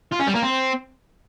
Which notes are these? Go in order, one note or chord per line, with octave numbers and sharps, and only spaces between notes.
F4
C#4
G3
A#3
C4